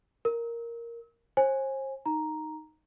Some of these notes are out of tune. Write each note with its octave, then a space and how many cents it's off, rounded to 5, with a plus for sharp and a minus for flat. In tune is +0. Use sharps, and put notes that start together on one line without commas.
A#4 +0 E6 -40
C5 +40 G#5 -5
D#4 -5 A#5 +0